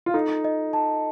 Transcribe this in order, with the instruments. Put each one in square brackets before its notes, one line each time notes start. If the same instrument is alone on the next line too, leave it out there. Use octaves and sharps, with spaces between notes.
[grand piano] F4
[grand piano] D#4 [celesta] A4
[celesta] D#5
A5